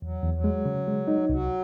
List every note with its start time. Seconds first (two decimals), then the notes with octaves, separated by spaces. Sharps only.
0.02 E2 F#3
0.23 E2
0.34 F#3
0.44 G#3
0.66 C#3
0.87 G#3
1.08 D#4
1.29 C2 F#3